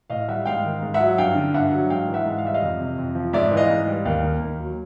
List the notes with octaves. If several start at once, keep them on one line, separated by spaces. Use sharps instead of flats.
A2 D#5 F5
G3 E5 F#5
G#2 F5 G5
D#3
G#2
E5 F#5
F#3
G2 F5 G5
D3
G2 E5 F#5
F#3
G#2 F5 G5
E3
E5 F#5
G#2
F5
G3 E5
D#5 F5
F2
C3
F2
F3
G#2 D5 E5
E3
D#5 F5
G#2
G3
D#2 F5 G5
D#3
D#2
F#3